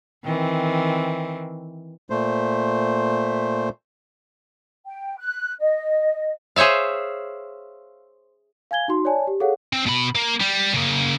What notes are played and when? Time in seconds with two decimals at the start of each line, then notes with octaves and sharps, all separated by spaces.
0.25 D#3 E3 C4
2.10 A#2 A3 C5
4.86 G5
5.18 F#6
5.59 D#5
6.56 G#4 C5 C#5 E5 F5
8.71 F5 G#5 G#6 G7
8.88 D#4 F#4 C6
9.05 C#5 D5 G#5 A5
9.27 G4
9.40 G#4 A4 C#5 F5 F#5
9.73 C4
9.86 B2 B5
10.15 A#3
10.41 G3
10.74 C#3 A#3